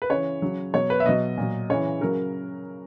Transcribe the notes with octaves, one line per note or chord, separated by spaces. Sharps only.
B4
C#3 E3 C#5
C#3 F#3
B2 F#3 C#5
B4
E5
B2 F#3 D#5
A#2 F#3
C#3 E3 C#5
C#3 F#3 A#4